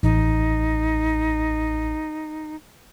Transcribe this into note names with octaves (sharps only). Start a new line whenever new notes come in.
A1 D#4